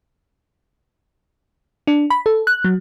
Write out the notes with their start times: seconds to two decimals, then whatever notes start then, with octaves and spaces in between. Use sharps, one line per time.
1.87 D4
2.10 B5
2.26 A4
2.47 F#6
2.65 F#3